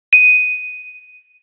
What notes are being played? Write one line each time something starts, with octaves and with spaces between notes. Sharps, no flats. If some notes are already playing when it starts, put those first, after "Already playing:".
D#7